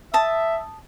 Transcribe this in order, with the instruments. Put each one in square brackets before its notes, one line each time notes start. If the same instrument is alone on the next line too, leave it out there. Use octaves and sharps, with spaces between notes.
[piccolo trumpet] E5 [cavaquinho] A5 D#6